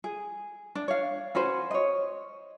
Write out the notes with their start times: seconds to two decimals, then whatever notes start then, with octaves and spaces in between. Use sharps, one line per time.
0.04 G#4
0.75 D4
0.88 C#5 F5
1.35 C#4 F#4 B4 C5
1.71 C#5 D#5